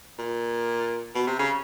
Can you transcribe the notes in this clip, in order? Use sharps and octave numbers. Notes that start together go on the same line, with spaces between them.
A#2
B2
C3
C#3